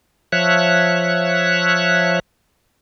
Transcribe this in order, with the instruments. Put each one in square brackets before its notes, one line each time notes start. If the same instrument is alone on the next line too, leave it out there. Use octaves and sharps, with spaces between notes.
[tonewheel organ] F3 C#5 E5 F#6